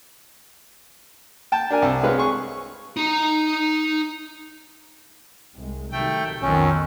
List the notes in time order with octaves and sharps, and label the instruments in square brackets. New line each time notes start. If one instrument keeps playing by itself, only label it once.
[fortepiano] G5 A5
D4 A#4 G#5
C2
G#3 B4 C#5 F5
G#4 C#6
[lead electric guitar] D#4 A#5
[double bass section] C2 G#3
[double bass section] C3 D#3 F#3 [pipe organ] A3 G5
[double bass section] B1 B2 [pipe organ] F2 [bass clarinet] D#3 [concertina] C#4